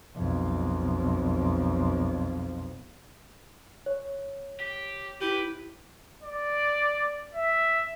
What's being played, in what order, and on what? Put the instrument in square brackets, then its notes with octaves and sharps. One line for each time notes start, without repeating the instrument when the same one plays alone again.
[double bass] B1 F2
[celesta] C#5
[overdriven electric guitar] G4
[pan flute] E4 [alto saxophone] G4 [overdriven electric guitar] B4
[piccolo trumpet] D5
E5